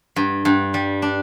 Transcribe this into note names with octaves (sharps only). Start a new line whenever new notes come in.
G2
G2
G3
D4